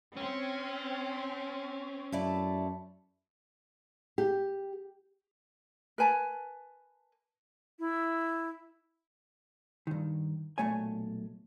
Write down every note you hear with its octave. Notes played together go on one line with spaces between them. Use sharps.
C4 C#4
F#2 A3 E4 D5
G4
A#4 B4 G#5 A5
E4
G2 D#3
B1 A#2 A3 C#5 G#5